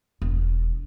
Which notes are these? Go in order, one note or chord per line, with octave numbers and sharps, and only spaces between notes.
E1